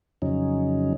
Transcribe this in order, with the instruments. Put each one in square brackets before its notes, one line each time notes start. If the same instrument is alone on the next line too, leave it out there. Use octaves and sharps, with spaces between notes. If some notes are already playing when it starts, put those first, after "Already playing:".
[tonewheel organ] F2 C#3 F#3 C#4 D#4